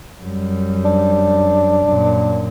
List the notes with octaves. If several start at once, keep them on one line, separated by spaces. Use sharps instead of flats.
F#2 G3
D4
F#2 A#2